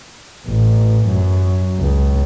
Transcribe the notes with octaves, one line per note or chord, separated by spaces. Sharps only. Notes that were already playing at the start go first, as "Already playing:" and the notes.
A1
F#2
C#2